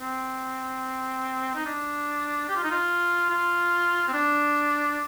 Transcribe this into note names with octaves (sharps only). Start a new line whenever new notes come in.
C4
D#4
D4
G4
F4
D#4
F4
F4
C4
D4